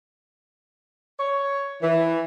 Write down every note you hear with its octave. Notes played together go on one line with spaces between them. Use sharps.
C#5
E3